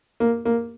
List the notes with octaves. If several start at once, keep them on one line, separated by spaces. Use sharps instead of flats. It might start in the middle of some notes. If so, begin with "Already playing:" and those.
A#3
A#3